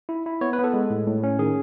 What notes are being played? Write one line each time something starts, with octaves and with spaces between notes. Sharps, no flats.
E4
E4
B3 C#5
B4
B3
A4
G#3
A2
A2
C#4
D#3 G#4